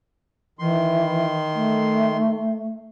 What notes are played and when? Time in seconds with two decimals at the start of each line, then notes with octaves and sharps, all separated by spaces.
0.59 D#3 E3 C6
1.55 A3